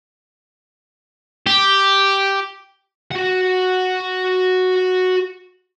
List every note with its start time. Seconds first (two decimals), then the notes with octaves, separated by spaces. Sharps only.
1.47 G4
3.11 F#4 F#5